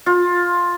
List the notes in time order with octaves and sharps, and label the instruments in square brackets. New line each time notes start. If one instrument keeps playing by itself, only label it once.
[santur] F4